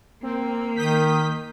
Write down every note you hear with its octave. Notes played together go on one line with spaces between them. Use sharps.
A#3 C4
D#3 D#6 G6 B6